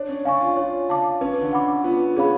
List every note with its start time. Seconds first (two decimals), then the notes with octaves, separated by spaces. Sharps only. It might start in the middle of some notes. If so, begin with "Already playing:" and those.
Already playing: D4 C#5
0.09 C#4
0.25 D4 F5 G#5 C#6
0.41 F4
0.57 F4 C#5
0.89 F5 A5 D6
1.21 C#4 B4
1.42 D3
1.53 F#5 B5 D6
1.84 B3 F4
2.16 C#4 G#4 C#5 F5 B5